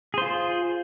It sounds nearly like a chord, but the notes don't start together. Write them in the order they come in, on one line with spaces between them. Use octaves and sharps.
G#4 C5 F4